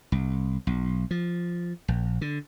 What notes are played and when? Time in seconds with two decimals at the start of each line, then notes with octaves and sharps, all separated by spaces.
0.12 C2
0.67 B1
1.11 F3
1.88 A#1
2.21 D3